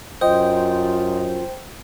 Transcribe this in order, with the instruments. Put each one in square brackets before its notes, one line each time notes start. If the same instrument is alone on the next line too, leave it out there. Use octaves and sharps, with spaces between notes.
[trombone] F#2 [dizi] F4 [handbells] C5 G5 [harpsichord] D#5